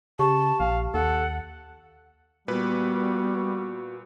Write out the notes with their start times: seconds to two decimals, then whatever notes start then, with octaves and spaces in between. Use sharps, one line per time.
0.19 C#3 G4 A5 C#6
0.60 A#1 F5
0.94 D#2 A4 F#5
2.48 A#2 G3 B3 F#4 B4